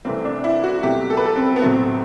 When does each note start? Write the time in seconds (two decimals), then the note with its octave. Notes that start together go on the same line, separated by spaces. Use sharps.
0.05 C2 C3 E3 A3 C4
0.25 D4
0.44 E4
0.64 F#4
0.83 C2 B2 F#3 A3 G4
1.10 A4
1.17 B4
1.25 A4
1.36 C4
1.56 B3
1.62 B1 A2 F#3 A3 C4